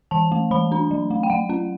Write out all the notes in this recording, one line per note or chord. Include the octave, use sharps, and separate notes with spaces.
E3 A5
A3
E3 B5
D4
F#3
A3
G5
F#3 F#5
C#4